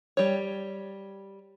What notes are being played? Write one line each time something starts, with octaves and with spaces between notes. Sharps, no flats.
G3 C#5